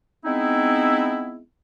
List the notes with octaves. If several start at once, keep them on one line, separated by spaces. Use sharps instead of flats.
G#3 B3 C4 D#4 E4